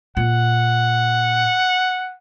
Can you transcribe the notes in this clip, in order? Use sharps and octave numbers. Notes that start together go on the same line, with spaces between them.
A#2 F#5